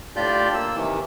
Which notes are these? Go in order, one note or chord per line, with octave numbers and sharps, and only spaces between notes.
A2 D4 F4 G4 D5 G6
A#3 E6
C3 D#3 E3